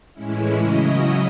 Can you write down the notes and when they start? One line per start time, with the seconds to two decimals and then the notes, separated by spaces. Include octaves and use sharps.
0.14 A2 E3 G#3 C#4 E4
0.58 C#3 F#3 C#4 E4 D#5